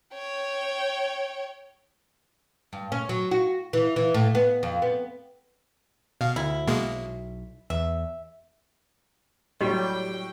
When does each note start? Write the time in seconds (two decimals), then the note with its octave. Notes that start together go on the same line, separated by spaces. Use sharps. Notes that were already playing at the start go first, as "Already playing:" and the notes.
0.14 C#5 G5
2.73 G2
2.92 C#4
3.09 F#3
3.31 F#4
3.73 E3
3.96 E3
4.14 A2
4.35 B3
4.63 F2
4.82 B3
6.21 B2 F5
6.36 D2 E4
6.68 B1 B2 G#3 A#3
7.70 E2 E5
9.61 A2 F#3 G3 F#4 G4 D#5 G5